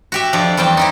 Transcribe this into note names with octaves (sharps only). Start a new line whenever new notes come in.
F#4 G4 E5
F2 F3 D4
E2 G3 C4 G5 A5
D#4 E4 G4